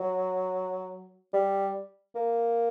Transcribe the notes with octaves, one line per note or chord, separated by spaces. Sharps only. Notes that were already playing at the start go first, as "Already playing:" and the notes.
Already playing: F#3
G3
A#3